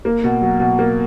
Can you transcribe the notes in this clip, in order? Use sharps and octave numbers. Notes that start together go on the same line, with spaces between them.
A#3
B2
F#3
B2
A#3